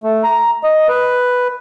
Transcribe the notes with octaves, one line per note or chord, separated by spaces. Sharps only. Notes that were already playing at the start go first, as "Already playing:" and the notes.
A3
A#5
D#5
B4